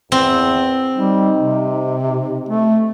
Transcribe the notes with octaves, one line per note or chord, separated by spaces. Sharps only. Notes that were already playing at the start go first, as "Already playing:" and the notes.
E2 C4
G3 D#4
C3
A3